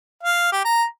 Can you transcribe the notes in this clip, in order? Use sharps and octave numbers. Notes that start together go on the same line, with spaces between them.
F5
G4
A#5